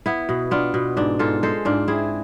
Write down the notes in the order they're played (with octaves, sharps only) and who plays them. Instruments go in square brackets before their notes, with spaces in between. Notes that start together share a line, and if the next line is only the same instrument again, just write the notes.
[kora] B3 E4
B2
B3 D4 F4
B2
G#2 D4
G#2 F4 A4
G#3 A4 C5
G#2 D4 F4
C4 E4 G#4